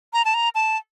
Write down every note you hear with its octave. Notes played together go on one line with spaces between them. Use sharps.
A#5
A5
A#5
A5